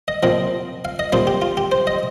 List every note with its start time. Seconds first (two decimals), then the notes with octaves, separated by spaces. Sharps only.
0.08 D#5
0.23 A#2 F3 C4 D#5
0.85 F5
0.99 D#5
1.12 A#2 G3 C4 D#4 C5
1.27 G4
1.42 F4
1.57 G4
1.72 C5
1.87 D#5